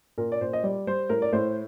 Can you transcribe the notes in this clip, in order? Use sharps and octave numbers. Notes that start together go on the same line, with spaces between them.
A#2 A#4
D5
A#2 C5
D#5
G3 D5
G3 C5
A2 A#4
D5
A2 C5